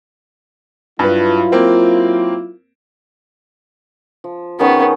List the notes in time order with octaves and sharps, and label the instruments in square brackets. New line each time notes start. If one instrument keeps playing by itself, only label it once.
[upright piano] G2 B4 [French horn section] F#3 E4 F4
[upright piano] A#3 C4
[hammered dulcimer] F3
[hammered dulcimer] D#3 C#4 G#4 [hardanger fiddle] B3